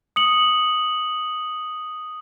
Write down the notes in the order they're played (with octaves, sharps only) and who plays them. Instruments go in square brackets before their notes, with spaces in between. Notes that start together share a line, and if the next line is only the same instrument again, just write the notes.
[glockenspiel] D#6 C#7 F#7